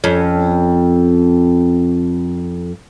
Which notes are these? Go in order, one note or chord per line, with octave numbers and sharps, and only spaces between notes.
F2 C#4